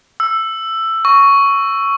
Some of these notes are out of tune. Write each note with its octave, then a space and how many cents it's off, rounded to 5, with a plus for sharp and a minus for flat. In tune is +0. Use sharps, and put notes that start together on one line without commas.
E6 +10
C#6 +5